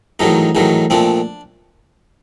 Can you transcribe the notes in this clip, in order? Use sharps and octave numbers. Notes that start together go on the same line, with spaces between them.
A1 G#2 D#3 F#3 A3 D#4
A1 G#2 D#3 F#3 A3
A#2 F3 A3 C4 D4